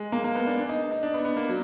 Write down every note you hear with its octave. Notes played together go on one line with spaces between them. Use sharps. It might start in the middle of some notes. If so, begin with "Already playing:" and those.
Already playing: G#3
A#3
A#3
B3
D4
D4
D#4
D#4
D4
B3
B3
A#3
F#3